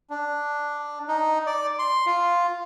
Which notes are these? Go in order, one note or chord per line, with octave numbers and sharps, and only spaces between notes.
D4
D#4
D5
C6
F4